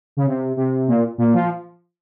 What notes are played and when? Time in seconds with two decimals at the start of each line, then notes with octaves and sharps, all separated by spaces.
0.17 C#3
0.26 C3
0.57 C3
0.88 A#2
1.18 A#2
1.34 F3